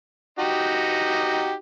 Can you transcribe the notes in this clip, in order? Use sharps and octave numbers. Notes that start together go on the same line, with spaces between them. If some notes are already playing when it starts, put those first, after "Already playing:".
D#4 F#4 G4